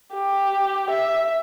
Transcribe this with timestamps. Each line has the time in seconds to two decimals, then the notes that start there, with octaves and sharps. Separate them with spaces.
0.14 G4
0.90 E5